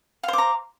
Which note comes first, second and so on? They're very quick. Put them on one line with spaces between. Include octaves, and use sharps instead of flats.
F5 C5 D6 A#5